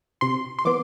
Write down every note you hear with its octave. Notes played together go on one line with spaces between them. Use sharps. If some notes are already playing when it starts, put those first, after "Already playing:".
C3 C6
C6
E3 B3 D6